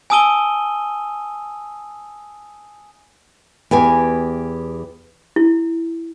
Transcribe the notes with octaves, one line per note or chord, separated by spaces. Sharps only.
G#5 A5 D#6 E6 D#7 G7
E2 G4 B4 G#5
E4